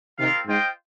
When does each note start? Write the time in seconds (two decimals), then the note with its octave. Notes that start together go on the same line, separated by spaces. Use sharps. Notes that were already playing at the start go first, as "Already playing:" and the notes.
0.18 C3 D#3 G3 C4 F4 A#4 F5
0.45 G#2 F4 C5 D#5 G5